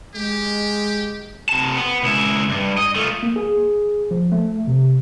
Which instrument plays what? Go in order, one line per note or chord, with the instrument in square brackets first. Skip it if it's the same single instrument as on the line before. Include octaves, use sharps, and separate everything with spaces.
[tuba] G#3 [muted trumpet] G4
[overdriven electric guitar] C3 A5
B3
C#2 E4
G2
D#5
A3 F4
[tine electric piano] A#3
G#4
F3
A3
C3